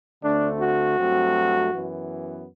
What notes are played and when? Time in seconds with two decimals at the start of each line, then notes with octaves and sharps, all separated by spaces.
0.23 D2 D3 A3 C4 D4
0.60 F#4
0.97 G2 F#3 A3 C4
1.72 F#2 E3 B3